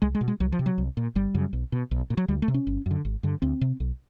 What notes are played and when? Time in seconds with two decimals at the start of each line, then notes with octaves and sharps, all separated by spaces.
0.02 C2 G#3
0.15 G#3
0.21 B2
0.28 G#3
0.40 C2 F#3
0.52 F3
0.59 C3
0.66 F#3
0.78 C2
0.97 A#2
1.15 G1 G3
1.34 F#2 C#3
1.53 B1
1.72 B2
1.91 B1
2.10 A#2
2.17 F#3
2.28 D2 G3
2.42 A3
2.48 C3
2.54 C#4
2.67 G1
2.86 F#2 D3
3.05 G#1
3.23 G2 D3
3.42 D2 C4
3.61 C3
3.80 B1